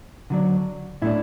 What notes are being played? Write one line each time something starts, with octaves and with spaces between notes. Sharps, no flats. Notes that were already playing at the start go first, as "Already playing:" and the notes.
D3 F#3 D4
A2 A3 D4 E4